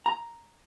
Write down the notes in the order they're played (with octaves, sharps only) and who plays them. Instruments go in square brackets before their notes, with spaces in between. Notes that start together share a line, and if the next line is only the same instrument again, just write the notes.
[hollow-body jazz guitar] A#5